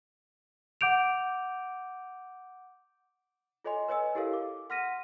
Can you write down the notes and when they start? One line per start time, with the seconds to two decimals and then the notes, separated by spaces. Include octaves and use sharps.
0.81 F#5 D6 G6 D7 F7
3.64 F4 A4 C#5 D#5 G#5 C6
3.88 B4 C#5 D#5 G#5 E6
4.15 E4 G4 A4 A#4 C#5 F5
4.33 D6
4.70 F#5 C6 F6 A#6 B6 D#7